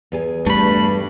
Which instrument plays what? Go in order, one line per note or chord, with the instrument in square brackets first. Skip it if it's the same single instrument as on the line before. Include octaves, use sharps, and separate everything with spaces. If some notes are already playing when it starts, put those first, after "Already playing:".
[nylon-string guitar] E2 G#4 G#5
[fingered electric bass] G2 [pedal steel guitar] A3 B5